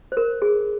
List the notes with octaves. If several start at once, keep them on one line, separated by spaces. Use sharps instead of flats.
C5
A#4
G#4